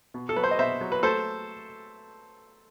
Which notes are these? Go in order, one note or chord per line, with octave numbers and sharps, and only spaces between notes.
B2
A4
F#3 B4
C5
D#5
B2 C5 E5
F#3
B4
A3 A4 C5